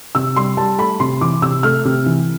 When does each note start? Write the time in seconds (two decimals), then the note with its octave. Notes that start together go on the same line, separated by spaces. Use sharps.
0.15 C3 E6
0.36 G3 C6
0.57 G3 A5
0.78 A3 B5
1.00 C3 C6
1.21 E3 D6
1.42 C3 E6
1.63 A3 F6
1.85 C3
2.06 E3